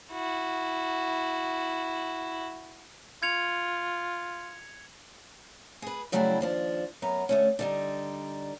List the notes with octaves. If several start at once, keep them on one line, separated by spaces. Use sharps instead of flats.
E4 F#4
F4 G#6 C#7 F7
G#4 B4
C#3 F#3 G3 A3 E4 G#4
D#2 F3 D4
F#2 B3 A#5
D2 A3 C#4
D3 G3 D#4